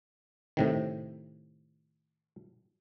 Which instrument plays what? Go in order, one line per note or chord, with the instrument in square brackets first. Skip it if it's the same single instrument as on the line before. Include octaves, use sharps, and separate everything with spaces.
[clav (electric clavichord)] A2 C3 D#3